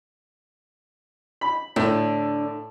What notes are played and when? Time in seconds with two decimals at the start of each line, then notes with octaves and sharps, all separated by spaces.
1.41 B5
1.76 A2 D3